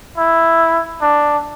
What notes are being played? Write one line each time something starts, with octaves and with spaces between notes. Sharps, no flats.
E4
D4